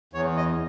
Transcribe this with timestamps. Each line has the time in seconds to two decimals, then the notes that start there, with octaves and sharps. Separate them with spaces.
0.13 E2 C#5
0.37 D#5